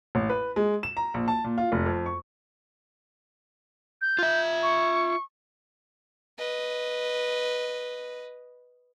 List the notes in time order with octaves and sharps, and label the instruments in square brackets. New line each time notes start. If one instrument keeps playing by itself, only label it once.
[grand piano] A1
B4
G#3
E7
A#5
A#1
A5
A#2
F4
F1
F2
C#6
[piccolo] G6
[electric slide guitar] F4 E5
[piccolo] C#6
[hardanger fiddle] B4 D#5